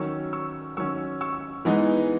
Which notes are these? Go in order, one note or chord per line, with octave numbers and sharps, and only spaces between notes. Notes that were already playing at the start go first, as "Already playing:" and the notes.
Already playing: D#3 F#3 C#4 C#6 E6
C#6 E6
D#3 F#3 C#4 C#6 E6
C#6 E6
E3 G#3 B3 D#4